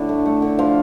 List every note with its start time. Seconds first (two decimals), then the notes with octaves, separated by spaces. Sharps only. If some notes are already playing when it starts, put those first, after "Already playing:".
Already playing: A2 D3 D4 E4 D5
0.09 A3
0.26 A3
0.42 D3
0.59 F3 F4 F5